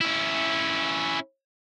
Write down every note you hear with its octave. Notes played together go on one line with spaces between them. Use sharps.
C#4 E4